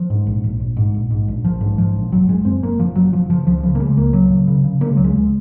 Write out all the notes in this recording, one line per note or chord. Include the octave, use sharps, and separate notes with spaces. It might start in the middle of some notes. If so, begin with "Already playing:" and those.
Already playing: F3
G#2
A#1
A#1
A#1
G#2
A#1
G#2
A#1
A#1 F3
G#2
G#2 F3
A#1
F#1 F#3
F#1 G#3
F#2 C4
F#1 A#3
F#1 F3
F#1 F#3
F#1 F3
C#3 F3
C#2 F3
C#3 F3
A#3
C#3 G#3
C#2 A#3
C#3 F#3
C#3
C#3
C#3
C#3 A#3
G#3
C#2 F#3
G#3
C#2